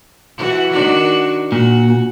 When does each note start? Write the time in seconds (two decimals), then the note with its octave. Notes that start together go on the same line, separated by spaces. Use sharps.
0.38 E3 F#4
0.71 D#3 D4 F#4
1.52 A#2 F#4